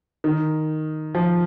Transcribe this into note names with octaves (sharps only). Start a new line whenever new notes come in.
D#3
F3